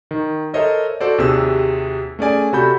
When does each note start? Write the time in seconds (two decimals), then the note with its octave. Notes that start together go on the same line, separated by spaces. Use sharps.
0.11 D#3
0.54 A4 A#4 C5 C#5 D#5 E5
1.01 F#4 A4 C5 D5
1.18 D#2 C3 F#4 G#4 E6
2.19 A3 C#4 G#4 D5 G#5
2.52 C3 F#4 A4 B5 G6